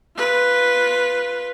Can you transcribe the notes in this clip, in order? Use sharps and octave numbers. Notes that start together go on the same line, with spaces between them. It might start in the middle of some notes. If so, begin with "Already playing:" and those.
F4 B4